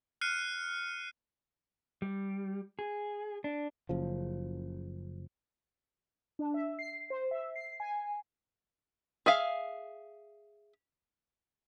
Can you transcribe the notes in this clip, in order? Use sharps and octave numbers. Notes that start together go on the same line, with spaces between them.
F6 F#6 C7 C#7 D#7
G3
G#4
D4
F#1 C#3 F3
D4
E5
C7
C5
E5
C7
G#5
G#4 E5 F5